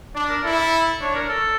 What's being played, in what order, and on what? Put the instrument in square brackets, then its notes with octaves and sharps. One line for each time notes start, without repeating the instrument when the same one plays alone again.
[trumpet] D4 [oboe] D5
[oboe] A#4
[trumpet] E4 [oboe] A4
[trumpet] D4 [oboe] C#5
[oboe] A#4
A4